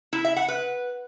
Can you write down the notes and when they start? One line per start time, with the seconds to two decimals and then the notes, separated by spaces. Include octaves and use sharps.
0.13 E4
0.25 E5
0.36 F#5
0.48 B4